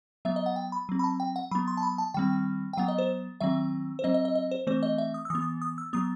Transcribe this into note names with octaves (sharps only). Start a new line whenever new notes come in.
F#3 B3 E5
D#5
F#5
G5
B5
F#3 C4
B5
A5
G5
F#5
F#3 B3 B5
C6
A5
B5
A5
D#3 G3 C4 G5
G5
F#3 B3 F#5
D#5
C5
D#3 F#3 C4 E5
C5
F#3 C4 D#5
D#5
D#5
D#5
C5
E3 A3 C4 C5
D#5
E5
D#6
E6
E3 B3 D#6
D#6
D#6
E6
F#3 B3 D#6